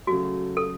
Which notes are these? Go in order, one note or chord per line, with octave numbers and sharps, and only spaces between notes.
C#3 F#3 A3 F#4
A4